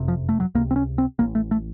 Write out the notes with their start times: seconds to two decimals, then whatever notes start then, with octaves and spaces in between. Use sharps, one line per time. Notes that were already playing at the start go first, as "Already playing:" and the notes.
Already playing: F#1 F2 C3
0.08 F3
0.29 A3
0.40 F#3
0.55 C#2 C3 A#3
0.71 C4
0.76 C#4
0.98 C4
1.19 A1 A2 A#3
1.35 A3
1.51 A3